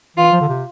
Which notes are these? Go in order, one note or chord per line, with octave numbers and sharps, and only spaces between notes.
E3 F4
F3
D3
C3